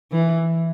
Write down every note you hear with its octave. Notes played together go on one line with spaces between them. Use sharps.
E3